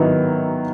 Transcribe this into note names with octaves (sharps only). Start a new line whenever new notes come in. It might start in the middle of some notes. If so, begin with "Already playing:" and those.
Already playing: D#3 F#3 B3 E4